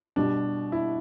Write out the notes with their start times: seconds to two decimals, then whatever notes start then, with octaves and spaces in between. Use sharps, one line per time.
0.16 B2 G3 D4
0.72 E4